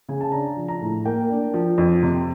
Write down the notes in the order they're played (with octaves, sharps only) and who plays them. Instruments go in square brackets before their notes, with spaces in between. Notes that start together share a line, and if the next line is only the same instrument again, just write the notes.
[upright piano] C#3 G#5
A5
D4 A#5
F3
A#5
A2
A#3 G5
D4
F3
F2
C3